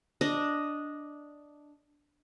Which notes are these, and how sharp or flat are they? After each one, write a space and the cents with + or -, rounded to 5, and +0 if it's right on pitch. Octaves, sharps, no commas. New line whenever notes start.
D4 +0 D#5 +0